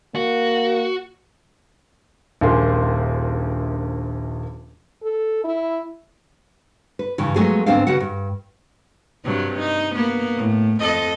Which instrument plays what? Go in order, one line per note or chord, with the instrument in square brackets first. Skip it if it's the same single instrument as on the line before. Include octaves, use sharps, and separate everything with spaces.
[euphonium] A#3 [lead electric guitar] F#4
[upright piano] D#1 A#1 A#3 G#4 C6
[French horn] A4
E4
[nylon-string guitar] B4
G2 C#3 E3
F3 F#3 G#3 A3 B3 G#4
D2 G#2 B3 C4 D4 F5
C#3 F#4 B4 F#5
G2
[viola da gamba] G2 C3 F#3
D#4
A#3 B3
A2
F2 A4 D#5